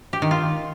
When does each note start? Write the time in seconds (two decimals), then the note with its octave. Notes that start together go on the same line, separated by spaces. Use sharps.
0.13 G4
0.22 D#3
0.31 F4